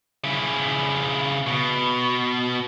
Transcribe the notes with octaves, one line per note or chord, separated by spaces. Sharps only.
C#3 E4
B2